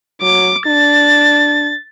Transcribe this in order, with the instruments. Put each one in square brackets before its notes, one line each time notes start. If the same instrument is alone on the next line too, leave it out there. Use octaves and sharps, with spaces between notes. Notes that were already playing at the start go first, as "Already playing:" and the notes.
[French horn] F#3 [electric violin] D6
[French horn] D4 [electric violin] A6